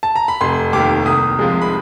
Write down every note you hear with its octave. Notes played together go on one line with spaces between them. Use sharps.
A5
A#5
B5
F1 C6
D#2 D#3 D6
C2 D#6
C3 F3 G#3
B5